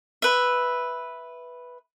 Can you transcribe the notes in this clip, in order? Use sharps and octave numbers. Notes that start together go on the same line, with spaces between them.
B4 E5